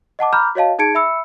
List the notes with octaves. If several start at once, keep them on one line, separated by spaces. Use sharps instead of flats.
D#5 F#5 A5 D6
A#5 B5 D6 F6 G6
F#4 C#5 D#5 F5 A5
D#4 G#4 A5 G#6 C#7 D7
E5 B5 E6 C#7